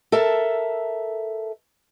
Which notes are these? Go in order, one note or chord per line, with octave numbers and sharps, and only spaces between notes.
A4 A#4 E5 A5